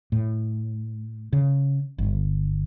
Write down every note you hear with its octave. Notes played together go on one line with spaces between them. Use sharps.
A2
C#3
G1